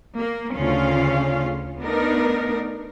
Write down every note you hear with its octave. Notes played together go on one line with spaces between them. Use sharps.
A#3
D2 C#3 C#4 F4 F5
A3 B3 D4 D#4 A#4